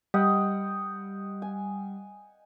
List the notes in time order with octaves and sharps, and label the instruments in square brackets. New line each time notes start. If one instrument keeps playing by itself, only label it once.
[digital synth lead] G3 [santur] D#5 F#5 G5
[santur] G#5